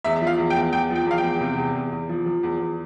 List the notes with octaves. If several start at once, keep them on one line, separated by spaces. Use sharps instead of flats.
E2 E5
E5
F3
F5
E2
G5
E2
E2 G5
F3
G5
E2 F5
G5
E2
C3
E2
E2
E2
F3
F3
E2
E2